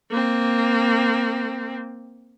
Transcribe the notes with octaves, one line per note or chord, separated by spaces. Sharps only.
A#3 C4